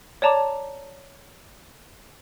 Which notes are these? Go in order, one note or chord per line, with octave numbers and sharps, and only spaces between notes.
C#5 D5 A5 A#5 D6